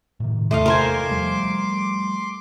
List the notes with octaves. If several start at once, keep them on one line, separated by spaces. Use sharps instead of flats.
A2 C3 D#3
E2 C3 A3 D#5 F5 C6 D6
A#4 C5 G#5
F3 G3 A3